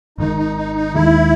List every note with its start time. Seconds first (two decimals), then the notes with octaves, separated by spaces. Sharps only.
0.18 G#1 G#2 D#3 D#4
0.37 D#4
0.56 D#4
0.75 D#4
0.95 D#2 D#3 G#3 E4